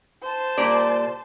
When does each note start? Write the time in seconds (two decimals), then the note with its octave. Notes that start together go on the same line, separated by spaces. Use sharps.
0.23 C5 A5
0.58 A#2 G3 D5